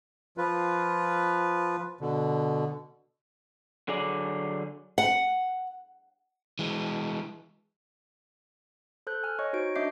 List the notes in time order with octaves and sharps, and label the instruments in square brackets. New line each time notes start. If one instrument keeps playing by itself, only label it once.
[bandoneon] F3 F4 B4
B2 D3
[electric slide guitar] D3 F#3 G#4 D5
[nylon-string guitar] F#5
[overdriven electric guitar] E3 G#3
[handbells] A4 C5 F#6 G6
G#5 F6
C#5 D#5 C#6
D#4 F#4 C5 D7
D4 D#5 E5 D6 G6 C7